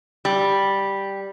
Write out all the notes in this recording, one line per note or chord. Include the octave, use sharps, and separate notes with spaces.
G3